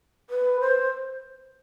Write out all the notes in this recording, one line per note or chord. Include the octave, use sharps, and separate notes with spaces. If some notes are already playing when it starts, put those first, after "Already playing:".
B4
C5